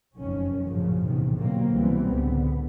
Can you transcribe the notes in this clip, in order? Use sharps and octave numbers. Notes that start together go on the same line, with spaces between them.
F1 F#2 D#3 C#4
A#1 F#2 A2 C#3 F3
A#1 E2 A2 C3 D#3
B2 D3 F#3 A#3 C4
C2 B2 E3 G3 B3 C4
C#2 A2 D3 B3